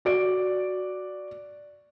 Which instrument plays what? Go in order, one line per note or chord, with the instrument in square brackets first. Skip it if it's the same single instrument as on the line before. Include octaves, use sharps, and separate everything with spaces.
[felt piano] F#4 D5 D7